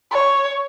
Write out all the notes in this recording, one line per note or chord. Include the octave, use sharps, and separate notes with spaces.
C#5